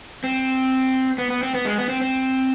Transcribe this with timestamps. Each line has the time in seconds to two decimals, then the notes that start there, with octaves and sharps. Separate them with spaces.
0.24 C4
1.18 B3
1.30 B3
1.43 C4
1.55 B3
1.66 G#3
1.78 B3
1.89 C4
2.01 C4